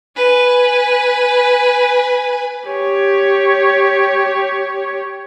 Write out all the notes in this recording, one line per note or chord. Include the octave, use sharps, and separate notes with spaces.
B4 G#5
G4 C#5